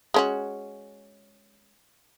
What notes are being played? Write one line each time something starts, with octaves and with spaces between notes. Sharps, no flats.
G#3 C#4 F#4